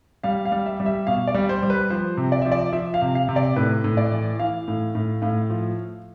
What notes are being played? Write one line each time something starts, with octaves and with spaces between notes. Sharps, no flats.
G3 F5
F5
G3
E5
G3
E5
B2 F5
D5
G3
C5
G3
B4
F3 C5
C3
D5
F3 E5
D5
F3 E5
F5
C3
F5
C3
D5
A2 B4
A2
D5
E3
E3 F5
A2
A2
A2 F5
F3